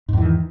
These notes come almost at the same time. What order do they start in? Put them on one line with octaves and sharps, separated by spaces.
G#2 E2 E3 D#3